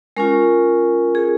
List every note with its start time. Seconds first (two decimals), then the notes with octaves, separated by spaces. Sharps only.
0.17 G#3 C#4 F4 A#4
1.15 G#4